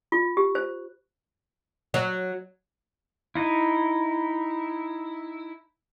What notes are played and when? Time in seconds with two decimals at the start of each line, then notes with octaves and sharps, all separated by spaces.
0.12 F4
0.37 G4
0.55 C5
1.94 F#3
3.35 D#4 E4